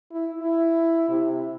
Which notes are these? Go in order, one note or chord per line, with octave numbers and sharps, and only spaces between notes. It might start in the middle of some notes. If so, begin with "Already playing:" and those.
E4
E4
C3